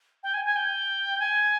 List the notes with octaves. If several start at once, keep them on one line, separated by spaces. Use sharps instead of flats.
G5
G#5
G#5
G5
G#5